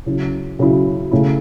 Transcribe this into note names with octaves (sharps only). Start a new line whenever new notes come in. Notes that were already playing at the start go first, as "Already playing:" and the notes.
C#3 F#3 C#4 E4
C#3 F#3 C#4 E4
C#3 A3 C#4 E4